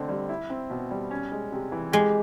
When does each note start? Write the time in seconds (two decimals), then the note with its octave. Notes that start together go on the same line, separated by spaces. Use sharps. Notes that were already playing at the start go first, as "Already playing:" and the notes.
Already playing: D3 A3 C4 D#4
0.09 G3
0.29 E4
0.50 C4
0.70 B2
0.91 G3
1.11 C#4
1.32 G#3
1.52 C3
1.72 E3
1.93 G#3 G4